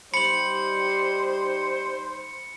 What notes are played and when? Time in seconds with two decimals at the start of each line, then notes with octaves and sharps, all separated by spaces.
0.14 G3 D#4 C5 B5 C#7 F#7